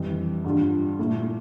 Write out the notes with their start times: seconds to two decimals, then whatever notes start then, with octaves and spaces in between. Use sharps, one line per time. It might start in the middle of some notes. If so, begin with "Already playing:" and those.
Already playing: F2 E3 G3
0.44 G2 D3 G3 D4 F4
0.99 A#2 A3 E4